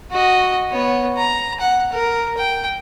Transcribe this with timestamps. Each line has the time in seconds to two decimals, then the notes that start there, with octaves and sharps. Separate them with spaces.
0.12 F#4 D#5
0.71 B3 C#5
1.16 A#5
1.60 F#5
1.93 A#4
2.38 G5